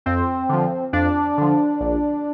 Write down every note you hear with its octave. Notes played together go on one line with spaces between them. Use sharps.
F2 C4
D3 F3
F2 D4
D3 F3
A#1